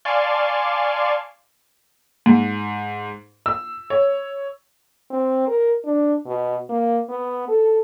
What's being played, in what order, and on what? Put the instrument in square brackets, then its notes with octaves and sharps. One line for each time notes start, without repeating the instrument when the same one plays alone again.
[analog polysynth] D5 F5 G#5 A5 C6 C#6
[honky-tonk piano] G#2
E6
C#5
[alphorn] C4
A#4
D4
B2
A#3
B3
A4